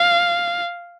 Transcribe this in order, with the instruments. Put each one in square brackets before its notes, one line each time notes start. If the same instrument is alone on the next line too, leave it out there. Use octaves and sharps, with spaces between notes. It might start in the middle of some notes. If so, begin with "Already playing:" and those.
Already playing: [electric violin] F5